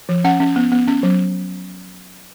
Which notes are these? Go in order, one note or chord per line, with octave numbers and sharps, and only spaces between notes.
F3
C#4 F#5
C#4
B3
B3
C#4
F#3